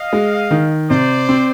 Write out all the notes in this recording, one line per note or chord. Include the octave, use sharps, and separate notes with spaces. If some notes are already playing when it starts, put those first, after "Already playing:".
Already playing: D#5 F5
G#3
D#3
C3 C5 D5
C4